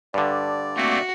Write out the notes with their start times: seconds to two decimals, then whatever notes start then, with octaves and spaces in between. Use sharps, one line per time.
0.14 G2 D3 D5
0.76 A3 A#3 C4 F#4